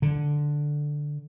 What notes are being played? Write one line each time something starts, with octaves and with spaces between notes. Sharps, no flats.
D3